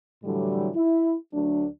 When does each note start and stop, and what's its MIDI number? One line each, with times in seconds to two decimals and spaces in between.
0.24 0.70 45
0.24 0.70 50
0.24 0.70 52
0.24 0.70 54
0.24 0.70 55
0.76 1.16 64
1.33 1.66 38
1.33 1.66 54
1.33 1.66 57
1.33 1.66 62